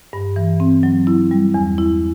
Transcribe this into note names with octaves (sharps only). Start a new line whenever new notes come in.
G2
E3
C4
F#3
E4
G3
E2
E4